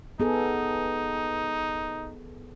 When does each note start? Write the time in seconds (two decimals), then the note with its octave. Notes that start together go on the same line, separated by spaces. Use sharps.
0.20 B3 D#4 G#4 A4